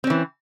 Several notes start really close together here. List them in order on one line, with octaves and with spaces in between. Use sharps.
C4 C#4 E3